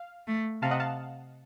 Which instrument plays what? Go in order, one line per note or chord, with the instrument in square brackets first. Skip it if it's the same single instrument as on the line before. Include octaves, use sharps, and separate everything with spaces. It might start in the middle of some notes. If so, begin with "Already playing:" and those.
Already playing: [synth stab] F5
[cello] A3
[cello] C3 [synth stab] F5 A5
[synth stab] D#5 F#5
F5 A5